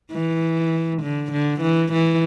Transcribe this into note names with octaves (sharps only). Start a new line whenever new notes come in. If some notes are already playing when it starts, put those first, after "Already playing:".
E3
D3
D3
E3
E3